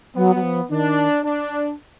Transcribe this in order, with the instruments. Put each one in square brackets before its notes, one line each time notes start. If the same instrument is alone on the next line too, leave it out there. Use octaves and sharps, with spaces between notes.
[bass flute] F#3 [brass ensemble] B3
[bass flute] F#3
F3
[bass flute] D#3 [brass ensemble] D4
[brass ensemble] D4